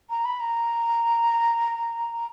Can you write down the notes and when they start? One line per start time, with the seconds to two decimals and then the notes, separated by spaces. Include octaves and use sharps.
0.09 A#5
0.24 B5
0.39 A#5